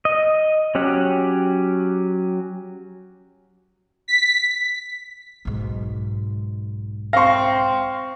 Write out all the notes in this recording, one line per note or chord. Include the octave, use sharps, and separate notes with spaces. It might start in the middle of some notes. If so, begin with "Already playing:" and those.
D#5
F#3 C#4 G4 F#5
B6
B1 G#2
C4 F5 C6 C#6 A#6